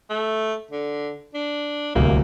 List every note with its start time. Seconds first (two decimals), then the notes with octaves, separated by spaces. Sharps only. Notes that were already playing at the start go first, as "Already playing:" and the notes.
0.10 A3
0.71 D3
1.34 D4
1.95 D1 C2 A#3